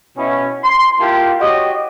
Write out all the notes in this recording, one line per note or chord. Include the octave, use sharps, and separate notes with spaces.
B2 C#4 E4
C6
A#3 E4 F4 G4 G5 A5
F#4 G4 C#5 D#5